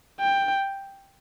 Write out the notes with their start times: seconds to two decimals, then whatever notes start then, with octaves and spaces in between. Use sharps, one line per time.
0.21 G5